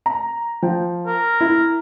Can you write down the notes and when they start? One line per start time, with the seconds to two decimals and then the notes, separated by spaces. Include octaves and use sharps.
0.06 A#5
0.62 F3 G5
1.07 A#4
1.41 E4